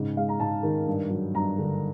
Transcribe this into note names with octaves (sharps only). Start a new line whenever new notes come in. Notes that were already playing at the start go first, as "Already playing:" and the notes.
Already playing: G#2 C#3
G#3 F5
A#5
G#2 A5
D#3
G2
F#3
G2 A#5
D3